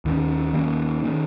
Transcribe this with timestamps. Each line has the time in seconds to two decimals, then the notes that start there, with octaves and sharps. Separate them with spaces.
0.05 D#2 D#3 A#3 C#4
0.53 D#2 D#3 A#3 C#4
1.04 D#3 A#3 C#4